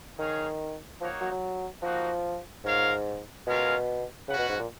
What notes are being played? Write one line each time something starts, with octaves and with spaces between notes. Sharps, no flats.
D#3 D#4 G#4 C#5 F5
F3 A#3 D#4 F#4 C#5
F#3
F#3
F3 A#3 D#4 F#4
G#2 F4 A#4 C#5 F5
B2 G#3 C#4 F4 A#4 F5
C#3 C#4 F#4 B4 F#5
B2
G#2
A#2